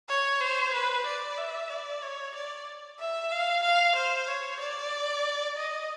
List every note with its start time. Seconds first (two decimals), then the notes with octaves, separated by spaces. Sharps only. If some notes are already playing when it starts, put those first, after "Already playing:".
0.09 C#5
0.41 C5
0.74 B4
1.06 D5
1.38 E5
1.70 D5
2.02 C#5
2.35 D5
3.00 E5
3.32 F5
3.63 F5
3.96 C5
4.28 C#5
4.60 D5
5.57 D#5